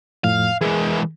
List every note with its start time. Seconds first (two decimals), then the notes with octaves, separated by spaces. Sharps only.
0.24 F2 A2 F3 F5
0.61 E3 G#3 G#4 A#4